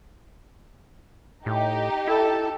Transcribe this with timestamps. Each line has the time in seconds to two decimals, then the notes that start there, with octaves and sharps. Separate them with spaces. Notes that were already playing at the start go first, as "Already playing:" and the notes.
1.46 A2 D#4 G4
2.07 E4 A4